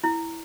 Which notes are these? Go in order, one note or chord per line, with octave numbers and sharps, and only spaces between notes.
E4